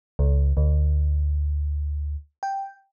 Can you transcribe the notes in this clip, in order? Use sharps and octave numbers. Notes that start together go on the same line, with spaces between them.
C#2
D2
G5